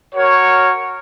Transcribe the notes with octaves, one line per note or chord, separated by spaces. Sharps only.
F#4 A#4 C#5